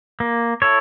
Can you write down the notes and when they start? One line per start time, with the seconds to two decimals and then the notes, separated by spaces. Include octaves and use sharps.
0.20 A#3
0.62 E4 A4 C#5